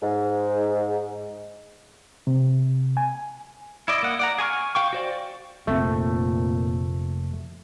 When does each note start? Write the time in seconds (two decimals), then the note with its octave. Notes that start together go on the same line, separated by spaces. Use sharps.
0.02 G#2
2.27 C3
2.97 G#5
3.88 E4 D5 D#5
4.03 A#3 F#5
4.19 D5 F#5 A#5
4.38 G#4 G#5 C#6 F6
4.75 F5 G5 C#6
4.93 F#4 C5 D5
5.67 F1 A#2 A3 C4